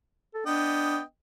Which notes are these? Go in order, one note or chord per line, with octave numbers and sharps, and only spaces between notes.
A4
B3 D4 D#5 G5